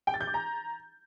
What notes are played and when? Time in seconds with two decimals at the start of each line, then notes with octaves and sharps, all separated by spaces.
0.07 G5
0.14 A6
0.21 G6
0.27 D6
0.34 A#5